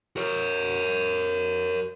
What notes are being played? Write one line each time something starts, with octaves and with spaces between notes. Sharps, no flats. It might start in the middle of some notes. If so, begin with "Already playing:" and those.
A#4 C#5